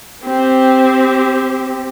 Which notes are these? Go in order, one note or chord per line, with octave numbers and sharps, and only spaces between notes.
C4 G4